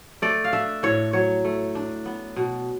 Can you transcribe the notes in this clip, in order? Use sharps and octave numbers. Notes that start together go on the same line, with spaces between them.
A3 D5
F5
D4 E5
A2 C#5
F#3 C#5
A3
D4
B3
B2